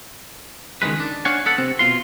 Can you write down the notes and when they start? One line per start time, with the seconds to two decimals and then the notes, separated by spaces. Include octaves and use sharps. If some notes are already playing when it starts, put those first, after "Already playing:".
0.82 C#2 D#3 F#3 G#3 B4
1.00 D4
1.25 D4 C#5 F5 F#5 G#5
1.46 B3 A4 F#5
1.58 C3 C4
1.79 B2 F4 C6